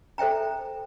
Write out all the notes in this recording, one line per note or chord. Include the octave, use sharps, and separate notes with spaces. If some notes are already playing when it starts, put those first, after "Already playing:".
A4 C5 E5 G5 A#5